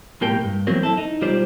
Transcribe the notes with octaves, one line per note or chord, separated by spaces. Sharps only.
B1 A2 A#3 G4 G5
G2
E3 F#3 A#3 C4
E4 A4
D#4
B1 G3 F4 G4 C5 D5